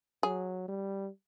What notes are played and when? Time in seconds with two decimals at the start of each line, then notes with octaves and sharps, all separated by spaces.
0.23 F#3 G#4
0.68 G3